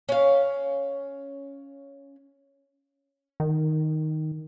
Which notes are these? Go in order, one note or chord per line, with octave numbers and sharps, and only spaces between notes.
C#4 F5
D#3